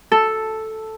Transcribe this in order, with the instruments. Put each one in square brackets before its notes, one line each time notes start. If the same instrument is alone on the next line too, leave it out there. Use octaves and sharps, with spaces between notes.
[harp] A4